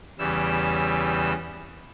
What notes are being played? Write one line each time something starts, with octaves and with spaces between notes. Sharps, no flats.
E2 C#3 E3 G3 E6